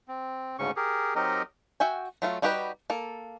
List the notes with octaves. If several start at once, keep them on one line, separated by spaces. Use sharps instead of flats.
C4
D2 G#2 C#3 C#4 C#6
G4 G#4 A#4
F#3 C4 D#4 G4 A#4 D#5
F#4 E5 G5 G#5
F#3 A3 F4
G3 D#4 F#4 G4 B4
A#3 A4